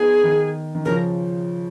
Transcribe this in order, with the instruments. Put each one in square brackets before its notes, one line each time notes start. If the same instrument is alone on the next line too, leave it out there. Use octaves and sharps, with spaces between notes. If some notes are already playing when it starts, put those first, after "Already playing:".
Already playing: [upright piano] B3 D#4 [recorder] G#4
[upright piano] D#3
D#3
[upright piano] C#3 F3 [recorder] A#4